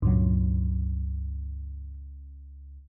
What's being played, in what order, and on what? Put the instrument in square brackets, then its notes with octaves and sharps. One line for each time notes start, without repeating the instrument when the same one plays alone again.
[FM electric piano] C#2 [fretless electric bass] G2 A#2 F#3